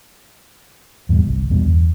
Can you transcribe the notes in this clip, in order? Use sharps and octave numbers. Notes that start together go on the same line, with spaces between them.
E2 G#2 B2 G3
G1 C2
E2 G2 B2 D3
E2